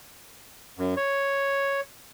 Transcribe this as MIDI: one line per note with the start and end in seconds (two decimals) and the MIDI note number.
0.78 0.94 42
0.97 1.81 73